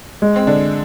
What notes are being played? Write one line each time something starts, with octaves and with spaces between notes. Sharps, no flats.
G#3
C4
D3 D4